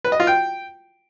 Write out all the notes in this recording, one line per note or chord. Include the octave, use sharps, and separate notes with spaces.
B4
D#5
F4
G5